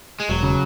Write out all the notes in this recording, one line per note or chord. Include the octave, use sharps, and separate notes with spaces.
G#3
E1 F#3
C#3